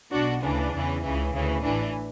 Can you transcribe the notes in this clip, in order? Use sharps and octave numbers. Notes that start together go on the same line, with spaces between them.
B1 B2 D4 F#4
D2 C#3 E3 D4
E2 C#3 E3
C#2 C#3 E3
D2 C#3 E3
A1 A2 E3 D4